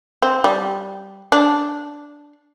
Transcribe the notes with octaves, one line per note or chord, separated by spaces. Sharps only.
C4
G3
D4